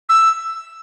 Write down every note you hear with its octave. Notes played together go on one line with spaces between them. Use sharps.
E6